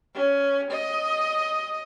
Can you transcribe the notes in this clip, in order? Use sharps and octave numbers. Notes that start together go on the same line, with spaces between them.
C#4
D#5